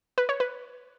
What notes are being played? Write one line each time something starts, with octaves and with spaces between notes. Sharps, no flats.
B4
C#5
B4